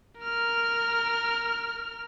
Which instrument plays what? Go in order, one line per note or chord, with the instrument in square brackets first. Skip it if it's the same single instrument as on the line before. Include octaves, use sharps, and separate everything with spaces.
[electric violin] A#4 F6